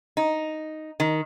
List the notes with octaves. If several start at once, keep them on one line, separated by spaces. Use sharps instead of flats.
D#4
D#3